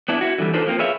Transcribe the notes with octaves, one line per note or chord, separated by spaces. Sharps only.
B3 D4 E4
E4 F#4
D3 E3 F3 G3
D4 D#4 F4 A4 B4 C5
F3 A#3 C4
G#4 B4 C#5 E5 F5